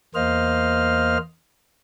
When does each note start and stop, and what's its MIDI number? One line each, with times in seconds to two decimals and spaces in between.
0.15 1.18 40
0.15 1.18 58
0.15 1.18 72
0.15 1.18 75
0.15 1.18 77
0.15 1.18 89